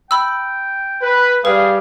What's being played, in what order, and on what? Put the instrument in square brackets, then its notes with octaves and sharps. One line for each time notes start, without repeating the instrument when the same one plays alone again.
[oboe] G5 [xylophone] B5 E6
[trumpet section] B4
[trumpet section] G3 F5 [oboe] G#4 [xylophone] B4